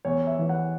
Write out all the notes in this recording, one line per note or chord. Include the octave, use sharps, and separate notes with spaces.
E2 C#5
E5
E3
F#5